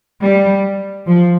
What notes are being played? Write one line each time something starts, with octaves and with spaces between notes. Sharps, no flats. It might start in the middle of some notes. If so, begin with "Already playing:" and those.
G3
F3